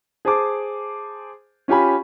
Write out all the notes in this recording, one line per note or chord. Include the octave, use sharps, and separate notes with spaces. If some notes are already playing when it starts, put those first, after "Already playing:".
G#4 C5 G#5 A5 D6
C#4 F4 G4 G#5 B5